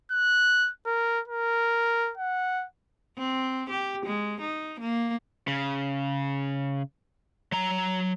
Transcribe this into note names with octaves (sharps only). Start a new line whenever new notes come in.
F#6
A#4
A#4
F#5
C4
G4
G#3
D#4
A#3
C#3
F#3 A#5